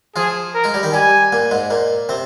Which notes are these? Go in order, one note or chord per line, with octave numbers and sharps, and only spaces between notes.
F3 F4 G#4
A#4
G#3 G#4
G3 G4
D#3 D#4
G3 G4 G#5
A#2 A#3
G#2 G#3
A#2 A#3
C3 C4